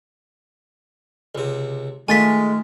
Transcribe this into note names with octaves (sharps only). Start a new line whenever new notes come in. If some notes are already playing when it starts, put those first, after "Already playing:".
C#2 C3
D#3 G#3 A3 F4 G#5 A6 B6